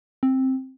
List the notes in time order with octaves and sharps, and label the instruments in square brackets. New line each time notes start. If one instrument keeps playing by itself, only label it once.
[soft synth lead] C4